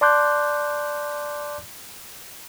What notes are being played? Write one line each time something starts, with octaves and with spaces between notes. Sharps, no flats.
D5 A5 C6 D6 F#6 G6